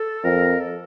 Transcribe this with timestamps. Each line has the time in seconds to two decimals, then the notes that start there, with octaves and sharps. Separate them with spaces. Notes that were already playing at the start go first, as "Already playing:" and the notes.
Already playing: A4
0.24 F2 A#4
0.60 A4